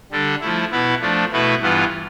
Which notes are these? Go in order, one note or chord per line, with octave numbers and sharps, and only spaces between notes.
D3 G3 D4 A4
F3 A3 E4
B2 B3 E4 B4
F3 A3 D4
B2 A3 E4 B4
G2 E3 B3 F4